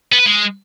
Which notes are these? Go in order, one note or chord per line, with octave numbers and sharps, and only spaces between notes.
B3
B4
G#3